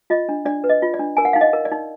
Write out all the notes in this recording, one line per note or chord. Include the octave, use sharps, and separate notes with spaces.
F4 D#5
D4
D4 D5
B4
D#5
F4
D5
D4
A#4 G#5
F#5
D#4 F5
D#5
A#4
D5
D#4